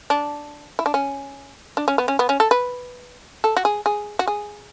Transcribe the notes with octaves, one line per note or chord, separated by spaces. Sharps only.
D4
E4
D4
C#4
D4
C#4
B3
C#4
B3
C#4
A4
B4
A4
F#4
G#4
G#4
F#4
G#4